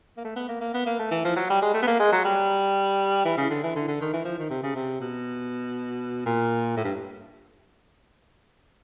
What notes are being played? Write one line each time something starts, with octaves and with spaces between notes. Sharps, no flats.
A#3
A3
B3
A#3
A#3
B3
A#3
A3
E3
F3
F#3
G3
G#3
A3
B3
A#3
G#3
F#3
G3
E3
C#3
D3
E3
D3
D3
D#3
E3
F3
D#3
C3
C#3
C3
B2
A#2
A2
G2